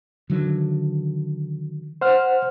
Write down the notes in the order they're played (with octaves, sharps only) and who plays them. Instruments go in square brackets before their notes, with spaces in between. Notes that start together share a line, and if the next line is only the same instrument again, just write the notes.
[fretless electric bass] D3 D#3 F#3
[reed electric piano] C5 F#5 F6